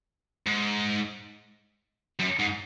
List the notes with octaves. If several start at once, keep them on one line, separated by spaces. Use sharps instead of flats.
G#2
F#2
G#2